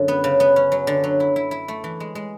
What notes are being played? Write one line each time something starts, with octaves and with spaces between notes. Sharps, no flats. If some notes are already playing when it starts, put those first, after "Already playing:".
Already playing: F#2 D3
B3
C#3
B3
C#4
F#3
D3
F#3
E4
E4
E4
A3
E3
G#3
G#3